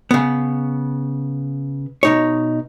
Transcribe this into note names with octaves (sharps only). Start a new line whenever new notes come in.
C#3 B3
B2 D#4 C#5